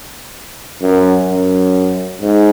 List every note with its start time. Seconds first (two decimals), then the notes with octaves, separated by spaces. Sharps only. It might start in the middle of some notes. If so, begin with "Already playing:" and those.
0.82 F#2
1.28 F#2
2.22 G#2